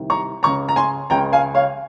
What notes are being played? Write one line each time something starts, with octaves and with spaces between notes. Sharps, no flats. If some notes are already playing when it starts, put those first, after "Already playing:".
Already playing: C2 C3 D#3
A#5 C#6
C#2 C#3 A#5 C#6
A#5
G#5 C6
C#2 C#3 G5 A#5
F5 G#5
C#5 F5